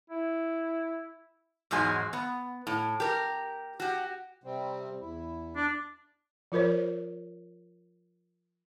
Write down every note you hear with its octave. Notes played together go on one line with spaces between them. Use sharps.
E4
E2 G#2 F#3 G#3 G#5
B3
A2
G4 A#4
F#4 G4
C3 G3 C4
E2 E4
D4
F3 F4 A#4 C5 C#5